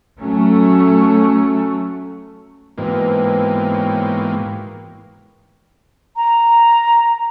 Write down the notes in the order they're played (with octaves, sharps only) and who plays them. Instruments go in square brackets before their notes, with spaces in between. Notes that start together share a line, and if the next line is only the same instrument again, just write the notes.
[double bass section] F#3 A3 C#4
[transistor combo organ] G#2 E3 A#3 [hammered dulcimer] B2 C4
[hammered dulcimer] C#5 G5
[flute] A#5